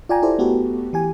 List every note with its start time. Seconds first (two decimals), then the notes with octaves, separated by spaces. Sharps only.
0.09 F4 D5 G5 G#5 A#5
0.22 E4 G4 A4 C5 D5
0.39 A3 B3 F#4 G4 A4 B4
0.93 E3 G4 G#5